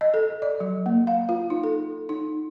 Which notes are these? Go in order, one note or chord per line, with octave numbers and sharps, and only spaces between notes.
D#5
A4
D5
F#3
A#3
F5
F4
D#4
A4
D#4